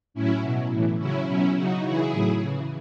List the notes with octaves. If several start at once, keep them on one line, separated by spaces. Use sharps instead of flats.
A2 F#3 C#4 E4
B2 F#3
A2 E3
C#3 F#3 C#4 E4
B2 F#3 C#4 E4
C#3 F#3 D#4 F#4
C#3 E3 E4 G#4
A2 F#3
C#3 E3